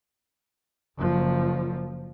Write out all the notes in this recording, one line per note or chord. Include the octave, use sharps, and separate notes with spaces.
F#1 F3